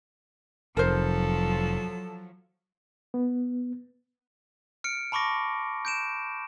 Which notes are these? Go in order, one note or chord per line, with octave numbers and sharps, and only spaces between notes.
F1 F3 F#3 A4 A#4 C5
B3
F6 C#7 D7
A5 B5 C#6 D6 A#6
G6 D7 E7